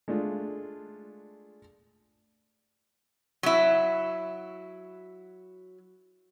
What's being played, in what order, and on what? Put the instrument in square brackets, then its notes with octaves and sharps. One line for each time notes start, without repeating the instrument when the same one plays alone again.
[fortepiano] G#3 A3 D4 F4
[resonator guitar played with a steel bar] F#3 E4